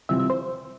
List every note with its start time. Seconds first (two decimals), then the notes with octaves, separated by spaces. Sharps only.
0.09 C3 E3 G3 C4 F4 E5
0.19 E5
0.30 C5